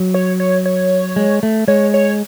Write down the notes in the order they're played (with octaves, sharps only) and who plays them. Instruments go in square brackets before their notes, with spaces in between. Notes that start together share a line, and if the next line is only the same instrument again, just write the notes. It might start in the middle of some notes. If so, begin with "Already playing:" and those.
Already playing: [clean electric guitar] F#3
[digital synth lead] C#5
C#5
C#5
[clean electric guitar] G#3
A3
[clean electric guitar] G#3 [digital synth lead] C#5
[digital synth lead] C#5